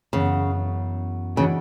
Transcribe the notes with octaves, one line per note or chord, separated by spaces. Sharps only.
F#2 C#3 E3 B3
C#3 E3 G#3 D4 F#4